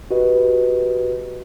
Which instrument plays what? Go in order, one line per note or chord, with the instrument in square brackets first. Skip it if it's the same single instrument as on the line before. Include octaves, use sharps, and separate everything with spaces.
[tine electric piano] F#4 G4 B4 D#5